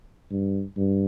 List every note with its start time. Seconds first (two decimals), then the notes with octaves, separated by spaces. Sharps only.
0.31 G2
0.77 G2